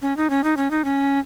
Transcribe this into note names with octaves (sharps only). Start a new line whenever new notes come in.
C#4
D#4
C#4
D#4
C#4
D#4
C#4